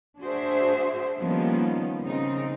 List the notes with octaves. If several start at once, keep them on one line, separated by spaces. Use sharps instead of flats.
D4 F#4 G#4 C5 E5
D#3 F3 G3 A#3 B3 C#4
C#3 C4 D#4